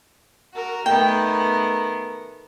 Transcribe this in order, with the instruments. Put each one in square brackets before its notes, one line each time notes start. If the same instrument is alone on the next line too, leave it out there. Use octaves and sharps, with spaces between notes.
[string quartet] F#4 A#4
[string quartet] D#3 A3 B3 [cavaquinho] G5